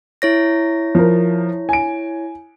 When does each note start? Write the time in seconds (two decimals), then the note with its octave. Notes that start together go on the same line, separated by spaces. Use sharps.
0.22 E4 C#5 A#6
0.95 F3 A#4
1.69 G#5 D7